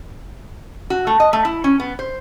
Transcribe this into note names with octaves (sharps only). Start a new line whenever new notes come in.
F#4
A3
D#5
A3
E4
C#4
B3
C5